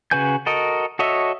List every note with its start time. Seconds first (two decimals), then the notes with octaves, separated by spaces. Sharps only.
0.11 C#3 F#4 B4 G#5 G6
0.46 F#4 A4 A#4 D#5
0.99 F#4 A4 C#5 D#5 E5